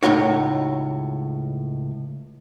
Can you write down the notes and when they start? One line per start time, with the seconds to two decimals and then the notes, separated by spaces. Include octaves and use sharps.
0.03 C#2 F#2 A2 D#4 F#4 C#5